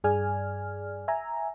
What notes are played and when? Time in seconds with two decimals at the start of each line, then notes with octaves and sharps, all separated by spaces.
0.04 G2 G#4 D5 G#5 F6
1.08 E5 G#5 A#5